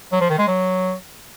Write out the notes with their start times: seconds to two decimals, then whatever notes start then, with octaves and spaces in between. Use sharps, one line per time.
0.12 F#3
0.21 F3
0.30 D#3
0.39 G#3
0.47 F#3